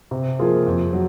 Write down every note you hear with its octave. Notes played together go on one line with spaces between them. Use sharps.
C3
F3 A#3 F4 G#4
F2
F#3